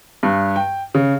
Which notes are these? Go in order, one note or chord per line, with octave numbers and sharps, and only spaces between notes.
G2
G5
C#3